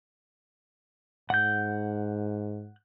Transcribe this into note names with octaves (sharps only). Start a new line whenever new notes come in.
G#2 F#5 G6